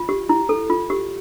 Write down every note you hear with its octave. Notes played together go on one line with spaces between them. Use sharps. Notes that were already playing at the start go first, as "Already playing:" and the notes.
Already playing: F4
G4
E4
A4
F4
G4